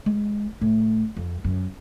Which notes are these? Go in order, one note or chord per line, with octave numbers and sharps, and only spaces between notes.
G#3
A2
F2
F#2